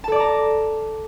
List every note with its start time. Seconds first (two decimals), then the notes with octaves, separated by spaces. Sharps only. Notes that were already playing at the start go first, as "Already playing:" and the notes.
0.04 A5
0.08 A4
0.12 D5
0.16 D6
0.20 A#5